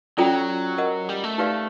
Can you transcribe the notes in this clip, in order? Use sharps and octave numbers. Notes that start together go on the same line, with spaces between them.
F#3 C#4 F4 A4 D5 G5
A#4 D#5 F#5
G3
A3
D#4 G4 B4 D5 F5